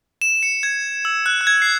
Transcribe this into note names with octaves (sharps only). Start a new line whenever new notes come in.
E7
C#7
G#6
E6
F#6
F#6
G#6
C7